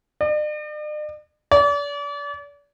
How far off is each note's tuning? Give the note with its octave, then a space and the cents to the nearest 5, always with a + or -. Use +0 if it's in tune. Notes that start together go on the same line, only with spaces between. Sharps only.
D5 +45
D5 -40